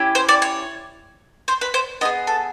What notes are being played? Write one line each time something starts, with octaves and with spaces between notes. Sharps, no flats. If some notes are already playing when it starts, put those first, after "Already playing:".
Already playing: C#4 E4 G4
C5
D5
C#5
C5
B4
C5
B3 E4 G#4 D#5
A4